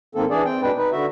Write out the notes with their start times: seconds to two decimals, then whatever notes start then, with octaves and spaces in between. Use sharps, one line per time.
0.15 G#2 D#3 A#3 C4 A4
0.30 E3 D4 G#4 D5
0.45 C4 G5
0.62 B2 G#3 D4 B4 G5
0.77 D#4 B4
0.92 D3 F#4 E5